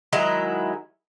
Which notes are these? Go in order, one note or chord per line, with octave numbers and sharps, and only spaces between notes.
D#3 F#3 G#3 E4